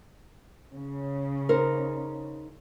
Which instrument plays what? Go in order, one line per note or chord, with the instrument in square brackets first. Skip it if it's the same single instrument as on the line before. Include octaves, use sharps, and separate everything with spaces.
[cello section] C#3
[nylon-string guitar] D#4 A#4 C5